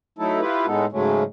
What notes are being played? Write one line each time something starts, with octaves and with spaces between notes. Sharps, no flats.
F#3 A3 D#4 E4 A4
E4 F4 G4 B4
A2 G#3 B3 D#4 A4
G#2 C#3 F#3 G#3 A3 C#4